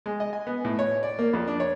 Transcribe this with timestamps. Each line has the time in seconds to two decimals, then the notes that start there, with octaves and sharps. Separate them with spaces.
0.06 G#3
0.20 D#5
0.33 G#5
0.47 B3
0.65 A2
0.79 C#5
1.03 D5
1.19 A#3
1.33 F2
1.47 D4
1.60 C#5